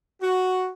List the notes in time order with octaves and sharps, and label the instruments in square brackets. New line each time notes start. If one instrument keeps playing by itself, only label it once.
[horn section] F#4